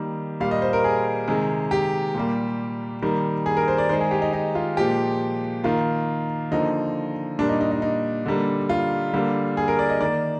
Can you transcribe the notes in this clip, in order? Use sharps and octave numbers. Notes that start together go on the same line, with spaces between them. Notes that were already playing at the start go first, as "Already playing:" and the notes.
Already playing: D#3 G3 A#3
A#2 G3 A#3 F5
D#5
C5
A#4
G#4
C3 D#3 G#3
G4
A#2 G3 A#3
D#3 G3 A#3
G#4
A#4
C5
D5
D#3 G#3 C5
G#4
G4
D#4
D#4
F4
A#2 F3 G#3 G4
D#3 A#3 F4
D3 F3 A#3 D#4
A#2 G3 A#3 D4
D#4
D#4
D#4
D#4
D3 G3 A#3
F4
D3 G3 A#3
G#4
A#4
D5
D#5
D#3 A#3 D5